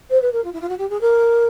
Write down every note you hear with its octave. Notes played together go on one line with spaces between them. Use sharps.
C5
B4
A#4
F4
E4
F4
F#4
G4
G#4
A#4